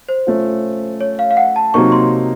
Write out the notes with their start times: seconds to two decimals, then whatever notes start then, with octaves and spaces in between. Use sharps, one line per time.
0.09 C5
0.27 A3 C#4 F4
1.01 C#5
1.19 F5
1.31 F5
1.37 F#5
1.56 A5
1.74 C3 F#3 A#3 D#4 C#6
1.92 C6